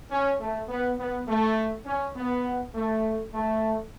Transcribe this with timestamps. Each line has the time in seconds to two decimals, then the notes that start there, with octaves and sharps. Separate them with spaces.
0.11 C#4
0.39 A3
0.68 B3
0.98 B3
1.27 A3
1.85 C#4
2.15 B3
2.74 A3
3.32 A3